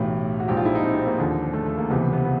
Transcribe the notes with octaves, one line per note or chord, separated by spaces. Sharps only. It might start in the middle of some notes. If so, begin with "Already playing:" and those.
Already playing: B1 A2 E3 G4
F#4
A#1 G#2 F3 G4
F4
E4
D#4
C4
C4
A#3
D#2 D3 F3
A3
A3
A#3
C#2 C3 E3 B3
B3
B3